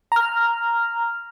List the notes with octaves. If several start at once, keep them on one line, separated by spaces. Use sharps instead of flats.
A#5 F6